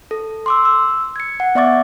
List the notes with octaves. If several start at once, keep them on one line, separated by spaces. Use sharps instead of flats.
A4
C6 D6 E6
E6
G#6 C#7
F#5
B3 D5 E5 C#6 D6 A6